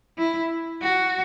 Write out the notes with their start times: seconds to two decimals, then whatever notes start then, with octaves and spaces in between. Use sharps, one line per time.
0.18 E4
0.82 F#4